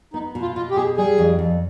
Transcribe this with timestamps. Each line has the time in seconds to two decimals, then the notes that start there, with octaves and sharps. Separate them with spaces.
0.13 B3 D#4
0.35 B2
0.42 F4
0.55 B2 F4
0.71 G4
0.76 B2 G#4
0.97 G3 G#4
1.18 F2
1.39 F2